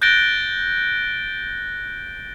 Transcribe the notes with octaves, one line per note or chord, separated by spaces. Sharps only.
F#6 G6 A6 A#6 D7 G7